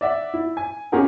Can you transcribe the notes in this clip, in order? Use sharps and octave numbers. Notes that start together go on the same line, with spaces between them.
D5 E5 F#5
E4
G#5
C#4 F4 G4 G#4 A#4 F#5